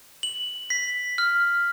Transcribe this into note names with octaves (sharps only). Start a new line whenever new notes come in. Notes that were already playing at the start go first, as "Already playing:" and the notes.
F#7
B6
F6